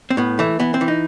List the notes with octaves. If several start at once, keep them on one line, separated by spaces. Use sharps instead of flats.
C4
A2 B3
E3 A3
E3 B3
C4
E3
D#4